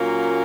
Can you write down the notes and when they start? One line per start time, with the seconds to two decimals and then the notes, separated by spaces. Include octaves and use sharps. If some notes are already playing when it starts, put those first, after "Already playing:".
Already playing: A#2 F#3 A#3 C#4